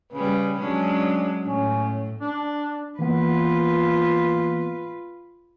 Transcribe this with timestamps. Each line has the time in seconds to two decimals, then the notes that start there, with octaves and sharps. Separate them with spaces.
0.13 C#3 G3 B4
0.58 F#3 G#3 C#4 D4
1.47 A2 C#4
2.21 D4
2.99 E3 A#3 B3 F4 B4